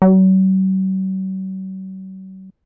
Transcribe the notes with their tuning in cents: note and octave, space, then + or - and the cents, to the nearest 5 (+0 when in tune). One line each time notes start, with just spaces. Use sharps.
F#3 +45